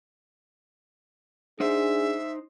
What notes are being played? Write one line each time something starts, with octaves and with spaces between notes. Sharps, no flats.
D4 D#4 G#4 C5 E5